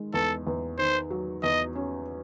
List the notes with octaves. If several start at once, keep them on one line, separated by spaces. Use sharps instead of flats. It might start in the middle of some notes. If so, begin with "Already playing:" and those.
Already playing: D#3 G#3
E2 A4
E2
D#3 C5
F#3
E2 D#5
C#4